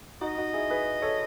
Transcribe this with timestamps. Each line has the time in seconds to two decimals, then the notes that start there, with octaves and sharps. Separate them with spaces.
0.21 D#4 F#4 D#5
0.38 D#4 F#4
0.53 E4 G#4
0.70 G#4 B4
1.02 A4 C#5